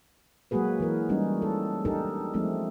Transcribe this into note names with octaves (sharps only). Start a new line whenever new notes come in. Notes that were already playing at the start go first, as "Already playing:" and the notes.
F#3 G#3 A#3 F#4 G#4 B4
E3 A#4
G3 G#3 C#4 D#4
A4
D4 D#4 G4 A4 A#4
F3 G#3 A3 C4 D#4